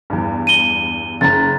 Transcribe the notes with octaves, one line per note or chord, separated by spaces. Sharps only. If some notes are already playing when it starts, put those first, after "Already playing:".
E2 G2
D#7 G7
F#1 A#5 A6